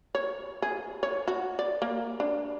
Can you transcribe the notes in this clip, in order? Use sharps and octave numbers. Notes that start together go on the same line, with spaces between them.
C#5
G#4
C#5
F#4
D5
A#3
D4